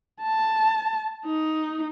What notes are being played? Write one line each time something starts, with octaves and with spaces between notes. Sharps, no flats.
A5
D#4